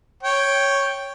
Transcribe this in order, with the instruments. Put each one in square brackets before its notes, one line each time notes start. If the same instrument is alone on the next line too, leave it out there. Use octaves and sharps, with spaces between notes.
[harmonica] C#5 G5